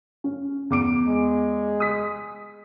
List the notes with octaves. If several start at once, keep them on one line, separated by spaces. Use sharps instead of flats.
C#4
E2 D6 D7
G#3
D#6 B6